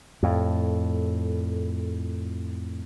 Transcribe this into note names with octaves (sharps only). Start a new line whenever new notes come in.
F2 A2